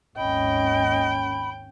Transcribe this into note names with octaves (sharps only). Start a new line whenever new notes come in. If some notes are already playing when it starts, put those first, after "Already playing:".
G#1 D#2 C#4 D#5 G5 B5